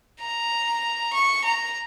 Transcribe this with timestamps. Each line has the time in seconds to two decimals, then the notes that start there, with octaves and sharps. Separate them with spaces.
0.21 A#5
1.13 C#6
1.45 A#5